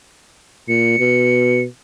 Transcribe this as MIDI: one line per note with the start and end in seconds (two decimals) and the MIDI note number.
0.69 0.96 46
0.69 1.62 97
0.99 1.65 47